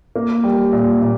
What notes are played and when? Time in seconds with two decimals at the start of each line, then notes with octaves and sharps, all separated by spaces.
0.16 A#3
0.44 G3
0.73 A#2
1.02 A#2